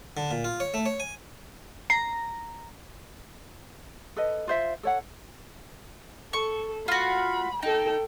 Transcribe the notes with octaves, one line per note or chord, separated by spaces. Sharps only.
D3
A#2
F4
C#5
A3
C#5
G#5
A#5 C7
A4 B4 D#5
F4 C5 E5
A4 C#5 F#5
A4 C#6
F4 F#4 B5
D#4 A4 G5